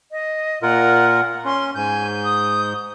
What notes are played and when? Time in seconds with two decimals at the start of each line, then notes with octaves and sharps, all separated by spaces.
0.12 D#5
0.62 A#2 F4 A#4 F#5
1.45 C#4 C6
1.75 G#2 G#5 G6
2.24 D#6